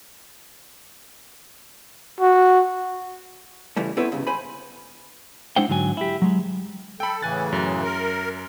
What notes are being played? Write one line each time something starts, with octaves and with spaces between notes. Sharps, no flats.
F#4
C#2 E3 G3 A3
B3 C4 E4 A4 B4 C#5
B1 G2 C#3
C5 G#5 B5
G#3 D4 E4 C5 F#5 G5
G#2 D3 F#3 A#4 G#5
E4 G4
F#3 G#3
A4 G5 B5
A2 C#3 E3 G#5 F#6 A6
F#2
A#4